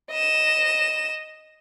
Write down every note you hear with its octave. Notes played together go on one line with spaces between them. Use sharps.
D#5 E7